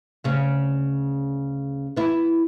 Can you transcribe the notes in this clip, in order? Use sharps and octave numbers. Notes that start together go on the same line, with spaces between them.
D2 C#3 C#4
B3 E4